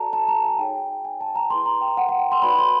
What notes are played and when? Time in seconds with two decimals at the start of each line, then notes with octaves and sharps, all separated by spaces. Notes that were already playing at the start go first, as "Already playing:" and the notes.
Already playing: F#4 A4 D5 A5 A#5
0.13 A5
0.28 A#5
0.44 G#5
0.58 D#4 G#4 C#5 G5
1.05 G#5
1.21 A5
1.35 A#5
1.50 E4 G#4 B4 C6
1.66 A#5
1.81 G5
1.97 F#5
2.09 F#5
2.19 G5
2.32 C6
2.42 D#4 F#4 B4 D5 B5
2.59 C6